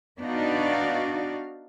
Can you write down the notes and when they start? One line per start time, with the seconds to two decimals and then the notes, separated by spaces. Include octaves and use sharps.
0.21 B3 D4 D#4 F#4 D5 F5